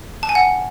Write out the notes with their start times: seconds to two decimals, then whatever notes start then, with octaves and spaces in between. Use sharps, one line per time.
0.23 A5
0.29 G#5
0.35 F#5